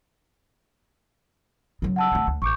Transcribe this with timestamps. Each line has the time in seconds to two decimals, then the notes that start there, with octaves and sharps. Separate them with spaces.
1.82 C#3 F#3
1.96 F#5 A5 E6
2.12 D#3 A3
2.27 D2
2.42 A1 C#6 D6 G6